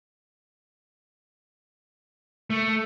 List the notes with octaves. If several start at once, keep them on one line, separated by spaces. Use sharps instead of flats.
A3